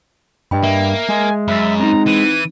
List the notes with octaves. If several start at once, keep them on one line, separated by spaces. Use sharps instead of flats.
G2 D#5 G5 B5
A#3 E5
G#3 G#5
F#2 E5 B5 A6
C4 D#4 A#5
E3 D#7